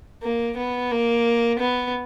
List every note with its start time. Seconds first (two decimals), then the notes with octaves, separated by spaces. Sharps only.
0.23 A#3
0.57 B3
0.91 A#3
1.59 B3